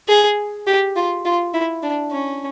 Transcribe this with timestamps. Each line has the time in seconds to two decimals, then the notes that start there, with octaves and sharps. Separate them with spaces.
0.08 G#4
0.67 G4
0.96 F4
1.25 F4
1.54 E4
1.83 D4
2.11 C#4